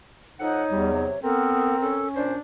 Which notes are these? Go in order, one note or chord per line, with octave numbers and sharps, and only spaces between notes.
F3 D#4 A4 C#5 F#5
E2 G3
C3 F#3
B3 C4 A4 A#4
C#4 A4
A#2 D4 C5